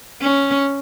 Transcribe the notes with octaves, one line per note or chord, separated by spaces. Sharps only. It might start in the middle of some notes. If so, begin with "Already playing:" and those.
C#4